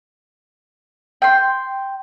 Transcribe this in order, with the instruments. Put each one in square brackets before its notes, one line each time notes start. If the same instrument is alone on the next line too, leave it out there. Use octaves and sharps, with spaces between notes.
[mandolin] G5 C6